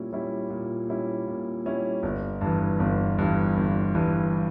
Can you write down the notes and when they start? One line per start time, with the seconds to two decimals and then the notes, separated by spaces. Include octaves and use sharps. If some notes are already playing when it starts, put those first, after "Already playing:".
Already playing: A#2 G3 C#4 E4
0.13 G3 C#4 E4
0.50 A#2
0.88 G3 C#4 E4
1.27 A#2
1.66 G3 C#4 E4
2.03 G1
2.41 G2 E3
2.80 G1
3.18 G2 E3
3.57 G1
3.95 G2 E3